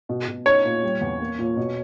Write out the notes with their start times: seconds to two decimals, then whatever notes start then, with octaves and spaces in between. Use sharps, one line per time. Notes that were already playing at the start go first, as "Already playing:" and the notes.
0.09 B2
0.27 B2
0.46 D#4 C#5
0.65 A#2
0.83 G3
1.01 E2
1.20 A#3
1.39 A#2
1.57 B2